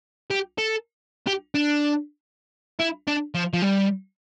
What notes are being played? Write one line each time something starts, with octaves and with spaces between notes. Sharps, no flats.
G4
A4
G4
D4
E4
D4
F3
F3
G3